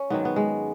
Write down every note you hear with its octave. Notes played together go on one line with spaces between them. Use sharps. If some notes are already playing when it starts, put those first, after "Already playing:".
Already playing: C#4
G#2 D#3 F#3 B3
B3
G#3